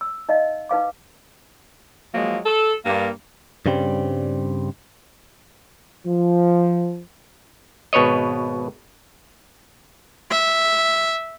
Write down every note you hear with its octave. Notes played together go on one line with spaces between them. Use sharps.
E6
D#4 D#5 F5
D#4 B4 F5 D6
F3 F#3 G#3 A#3
A4
G2 A#3
G2 C#3 G3 C4
F3
G#1 B2 B4 C#5 D#5
E5